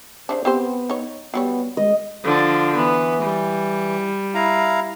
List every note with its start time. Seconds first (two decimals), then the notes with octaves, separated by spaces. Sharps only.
0.29 C#3 E3 D4 C5
0.45 B3 C4 G4 C5
0.90 D#4 C#5
1.34 F#3 G3 B3 C#5
1.77 G#3 D#5
2.24 D3 F3
2.76 E3 B3
3.22 G3
4.34 E4 F5 A#5